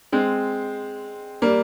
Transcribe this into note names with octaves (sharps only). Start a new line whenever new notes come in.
G#3 C4
G3 A#3